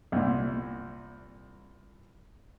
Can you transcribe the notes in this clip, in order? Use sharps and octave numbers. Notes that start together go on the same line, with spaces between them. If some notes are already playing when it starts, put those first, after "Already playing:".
C2 A#2